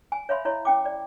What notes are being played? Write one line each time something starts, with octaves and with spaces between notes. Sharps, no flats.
G#5
C#5 E5 F5 B5 C6
E4 C#5 D#5 C6
C#4 G5 D6
D5